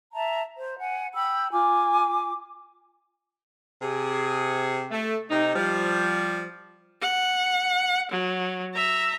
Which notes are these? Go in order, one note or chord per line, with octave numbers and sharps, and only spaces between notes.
E5 A5 A#5
C5
F#5 G#5
G5 B5 E6
F4 G#5 D6
C3 G#4
A3
C3 D#4
F3 G3
F#5
F#3
E5 A#5